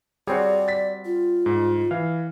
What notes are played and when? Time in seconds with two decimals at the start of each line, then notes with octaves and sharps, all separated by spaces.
0.27 G3 C4 F#4 G#4 C#5 D5
0.68 A6 B6
1.05 F4
1.46 G#2
1.91 E3 F5